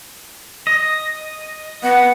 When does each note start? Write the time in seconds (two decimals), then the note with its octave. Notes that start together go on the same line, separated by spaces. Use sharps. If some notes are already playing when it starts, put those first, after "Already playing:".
0.67 D#5
1.83 B3 F#5